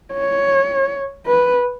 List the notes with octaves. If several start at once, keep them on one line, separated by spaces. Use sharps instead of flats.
C#5
B4